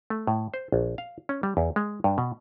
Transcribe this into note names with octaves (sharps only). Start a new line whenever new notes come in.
A3
A2
C5
A#1
F5
C#4
G3
E2
G#3
G2
B2